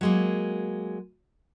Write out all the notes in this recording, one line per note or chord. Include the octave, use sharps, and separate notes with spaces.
F#3 G#3 A#3